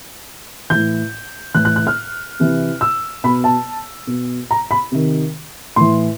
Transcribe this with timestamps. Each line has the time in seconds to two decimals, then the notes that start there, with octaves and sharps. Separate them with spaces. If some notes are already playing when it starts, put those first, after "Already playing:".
0.70 E3 G6
0.75 A2
1.54 A2 E3 F#6
1.65 F#6
1.76 F#6
1.87 F6
2.40 C3 E3
2.81 E6
3.24 B2 B5
3.44 A5
4.07 B2
4.51 A#5
4.71 B5
4.92 C3 D#3
5.76 A2 E3 C6